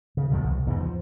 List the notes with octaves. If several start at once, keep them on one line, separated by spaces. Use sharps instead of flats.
C#3
E2 G2 B2 D3
C2
E2 G#2 C#3
F3